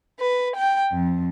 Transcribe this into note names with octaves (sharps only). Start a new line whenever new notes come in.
B4
G5
F2